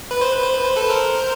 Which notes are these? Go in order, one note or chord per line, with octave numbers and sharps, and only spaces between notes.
B4
C5
B4
C5
B4
C5
A4 B4
A#4 C5